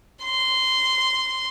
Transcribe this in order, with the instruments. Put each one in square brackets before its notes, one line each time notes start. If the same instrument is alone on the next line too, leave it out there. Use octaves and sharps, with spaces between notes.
[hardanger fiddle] C6